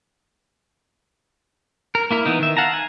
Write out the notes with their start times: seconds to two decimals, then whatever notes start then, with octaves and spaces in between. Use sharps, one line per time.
1.95 A#4
2.11 A#3 E4 A#4
2.26 E3 B3 D#4
2.39 D#3 E5
2.57 F5 F#5 A5 A#5
2.74 G#5